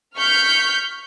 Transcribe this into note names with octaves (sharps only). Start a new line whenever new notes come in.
C#6 F6 G6 B6